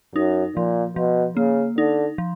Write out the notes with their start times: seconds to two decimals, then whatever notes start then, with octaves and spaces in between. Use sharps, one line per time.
0.15 F#2 D#4
0.56 A#2 F3
0.96 B2 F3
1.37 C#3 A#3
1.78 D3 D#4
2.18 F3